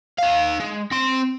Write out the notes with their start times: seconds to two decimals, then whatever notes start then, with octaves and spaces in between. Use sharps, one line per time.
0.19 D#4 F5
0.60 G#3
0.92 C4 C6